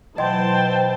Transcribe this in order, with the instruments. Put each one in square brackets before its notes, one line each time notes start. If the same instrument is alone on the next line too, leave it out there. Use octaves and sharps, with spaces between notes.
[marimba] B2 F#3 [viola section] E3 C5 A5 [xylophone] D#5 C6 [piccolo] G5